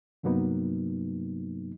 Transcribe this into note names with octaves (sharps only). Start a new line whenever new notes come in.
G2 C3 F#3 A#3 B3 D#4